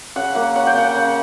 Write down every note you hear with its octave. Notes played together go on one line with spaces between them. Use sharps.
C#3 F#5
A#3 F#5
C#4 F#5
G5
C#3 F#5
C#3